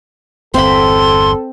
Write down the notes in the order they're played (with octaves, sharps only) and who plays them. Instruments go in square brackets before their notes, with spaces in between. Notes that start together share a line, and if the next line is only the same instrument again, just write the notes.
[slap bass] G1 E2 [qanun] C4 B5 [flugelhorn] A4 [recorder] C6